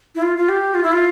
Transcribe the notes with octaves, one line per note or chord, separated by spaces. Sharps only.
E4
F4
F4
G4
F4
E4
F4